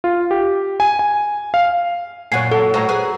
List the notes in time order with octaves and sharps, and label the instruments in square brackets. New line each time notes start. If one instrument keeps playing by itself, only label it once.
[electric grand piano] F4
G4
G#5
G#5
F5
[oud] F#2 A#2 [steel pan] C#5 F#5 G#5 [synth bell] C7
[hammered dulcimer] F#3 [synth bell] A4 [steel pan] F#5 A5
[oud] A2 C5 D#5 [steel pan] C#5 A#5
[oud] G#4 B4